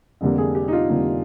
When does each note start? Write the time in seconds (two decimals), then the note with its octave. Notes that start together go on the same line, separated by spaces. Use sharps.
0.21 F1 F2 D3 G3 A#3
0.38 G#4
0.55 G4
0.68 D#4
0.72 F4
0.89 F1 F2 D3 G3 A#3 D#4